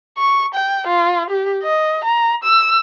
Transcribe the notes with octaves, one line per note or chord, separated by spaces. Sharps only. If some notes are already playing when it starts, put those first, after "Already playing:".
C#6
G5
F4
G4
D#5
A#5
E6